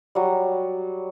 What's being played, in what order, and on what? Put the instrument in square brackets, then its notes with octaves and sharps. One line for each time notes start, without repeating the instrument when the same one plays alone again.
[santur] F#3 G3